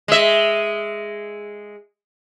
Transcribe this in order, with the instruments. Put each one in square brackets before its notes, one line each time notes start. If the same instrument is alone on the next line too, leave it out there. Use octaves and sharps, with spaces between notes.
[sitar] G#3 E5